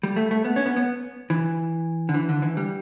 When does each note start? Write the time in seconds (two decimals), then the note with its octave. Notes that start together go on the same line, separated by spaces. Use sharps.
0.03 G3
0.16 A3
0.31 A3
0.45 B3
0.56 C#4
0.66 B3
0.76 B3
1.30 E3
2.09 D3
2.14 E3
2.29 D3
2.42 E3
2.57 G3